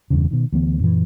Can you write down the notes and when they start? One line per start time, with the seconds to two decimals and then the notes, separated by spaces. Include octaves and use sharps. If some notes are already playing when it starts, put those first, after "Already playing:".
0.10 E1 E2 G2 C#3
0.31 B2 D#3
0.52 D2 E3 B3
0.80 F#2 A#2 E3